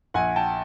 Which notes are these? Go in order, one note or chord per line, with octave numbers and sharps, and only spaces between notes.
A#1 F#5 G#5
G5 A5